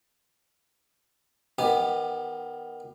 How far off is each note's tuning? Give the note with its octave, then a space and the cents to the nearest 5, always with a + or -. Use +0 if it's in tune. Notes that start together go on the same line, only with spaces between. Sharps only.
D#3 +0 B3 +0 G4 +20